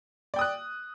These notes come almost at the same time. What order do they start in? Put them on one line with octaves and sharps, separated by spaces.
D5 G5 D#6 F#6